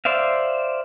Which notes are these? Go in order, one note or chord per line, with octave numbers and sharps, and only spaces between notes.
C5 D5 E5 F5